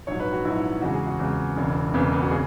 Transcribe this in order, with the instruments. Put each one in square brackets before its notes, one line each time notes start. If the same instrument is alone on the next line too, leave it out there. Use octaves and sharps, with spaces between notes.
[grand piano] A#1 G#2 F#3 C#5
B4
F#4
A#1 G#2 F#3 E4
E2 C#3 G#3 F#4
G#4
F#4
E2 C#3 G#3
E1 E2 C#3
E1 E2 C#3 B3
B3
F#4
C#3 G#4